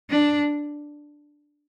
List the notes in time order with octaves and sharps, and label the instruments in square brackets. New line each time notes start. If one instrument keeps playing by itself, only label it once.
[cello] D4